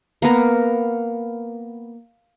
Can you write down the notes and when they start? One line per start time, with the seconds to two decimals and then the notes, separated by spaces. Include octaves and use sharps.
0.22 A#3 B3 A#4